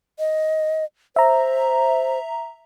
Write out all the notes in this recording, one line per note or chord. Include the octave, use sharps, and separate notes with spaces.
D#5
C5 E5 A#5